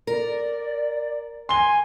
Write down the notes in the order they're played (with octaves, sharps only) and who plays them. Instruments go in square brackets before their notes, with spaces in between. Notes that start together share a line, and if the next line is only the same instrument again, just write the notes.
[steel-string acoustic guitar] A#4 [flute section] D5
[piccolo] G#5 [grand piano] C6 G7